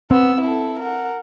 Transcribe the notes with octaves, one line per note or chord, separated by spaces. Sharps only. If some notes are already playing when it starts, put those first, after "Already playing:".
B3 C4 E6
E4 A4
A#4 F#5